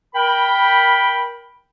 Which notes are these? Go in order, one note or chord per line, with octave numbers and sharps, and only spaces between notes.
A#4 G5 B5